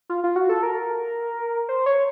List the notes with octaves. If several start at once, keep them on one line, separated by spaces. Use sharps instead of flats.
F4
F4
F#4
A4
A#4
C5
C#5